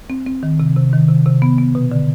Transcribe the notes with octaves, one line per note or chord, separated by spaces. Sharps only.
C4
C4
D#3
C3
C3
D#3
C3
C3
B3
B3
B2
D3